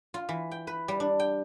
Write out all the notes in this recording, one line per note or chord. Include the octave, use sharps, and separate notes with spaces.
F4
E3
G5
B4
G3
D4
G5